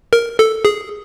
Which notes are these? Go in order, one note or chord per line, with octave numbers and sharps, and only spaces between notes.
A#4
A4
G#4